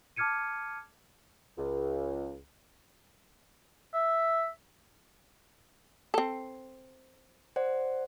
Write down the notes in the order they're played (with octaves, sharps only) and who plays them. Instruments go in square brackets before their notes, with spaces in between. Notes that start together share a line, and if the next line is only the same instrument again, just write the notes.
[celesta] A5 D6 F6 G#6 C#7 D#7
[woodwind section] C#2
[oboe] E5
[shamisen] C4 A4
[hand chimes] C5 D5 F#5